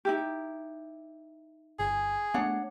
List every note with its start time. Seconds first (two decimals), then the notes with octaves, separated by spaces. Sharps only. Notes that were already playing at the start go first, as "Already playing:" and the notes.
0.05 D#4 E4 G4
1.79 G1 G#4
2.34 A3 B3 D4 C#5 F#5